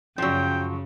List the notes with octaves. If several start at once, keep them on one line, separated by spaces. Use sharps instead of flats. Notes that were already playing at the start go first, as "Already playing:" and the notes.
F#2 C#3 F3 F#3 G5